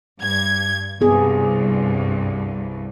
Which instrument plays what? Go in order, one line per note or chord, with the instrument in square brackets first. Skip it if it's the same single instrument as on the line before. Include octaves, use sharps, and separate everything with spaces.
[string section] G2 G#6
[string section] C2 G2 [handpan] B3 G#4